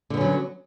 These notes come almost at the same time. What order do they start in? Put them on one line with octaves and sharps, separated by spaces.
D3 B3 C#4 F#3